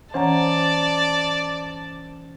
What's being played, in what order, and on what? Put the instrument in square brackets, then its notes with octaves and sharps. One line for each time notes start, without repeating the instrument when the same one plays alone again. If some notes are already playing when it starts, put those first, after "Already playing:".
[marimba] E3 F#5 A#5 [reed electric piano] C#4 C5 [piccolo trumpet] D5 [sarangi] A5